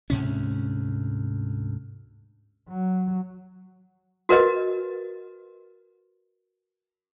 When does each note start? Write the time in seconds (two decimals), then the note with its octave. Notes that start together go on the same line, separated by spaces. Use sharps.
0.10 D2 G#2 C3 C#4
2.69 F#3
4.29 F#4 A#4 B4 D#5